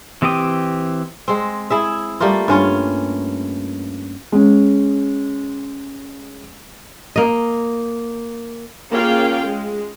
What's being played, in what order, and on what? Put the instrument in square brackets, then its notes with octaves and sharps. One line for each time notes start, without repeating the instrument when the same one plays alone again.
[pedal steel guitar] E3 C4 G4 G5 D#6
[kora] G#3 C4
E4 G#4 E5
G3 A3 A#3 F4
G2 C#4 F4 C#5
[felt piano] G#3 C#4
[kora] A#3 D#5
[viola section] A#3 C#4 F4 G#4 F5 G5
G#3